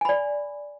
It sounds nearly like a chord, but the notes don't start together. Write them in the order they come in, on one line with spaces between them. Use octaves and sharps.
G#5 B5 D5